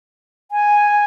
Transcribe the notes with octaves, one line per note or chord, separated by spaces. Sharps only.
G#5